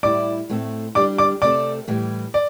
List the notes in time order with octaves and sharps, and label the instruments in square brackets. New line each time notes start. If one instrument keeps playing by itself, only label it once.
[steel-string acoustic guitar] A2 G3 E4 [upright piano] D5 D6
[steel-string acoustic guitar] A2 A3 C4 A4
[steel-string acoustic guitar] G3 D4 G4 [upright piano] D5 D6
[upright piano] D5 D6
[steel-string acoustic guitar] C3 A3 C4 A4 [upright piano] D5 D6
[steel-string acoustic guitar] A2 E3 G3
[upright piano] D5